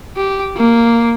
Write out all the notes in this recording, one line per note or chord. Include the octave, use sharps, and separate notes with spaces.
G4
A#3